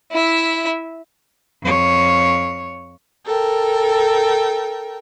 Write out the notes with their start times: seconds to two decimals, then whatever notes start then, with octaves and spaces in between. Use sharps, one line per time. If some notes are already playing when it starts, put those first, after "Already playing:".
0.11 E4 E5
1.63 F2 C#5
3.25 A4 A#4 G5